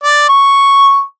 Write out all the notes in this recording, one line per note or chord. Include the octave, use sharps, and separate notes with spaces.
D5
C#6